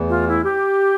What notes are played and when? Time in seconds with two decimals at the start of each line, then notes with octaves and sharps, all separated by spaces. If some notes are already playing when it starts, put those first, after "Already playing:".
Already playing: E2 E3 A3
0.09 F4
0.27 E4
0.45 G4